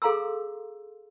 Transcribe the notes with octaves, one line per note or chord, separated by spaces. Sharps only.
G#4 A4 F5 A#5 C6 E6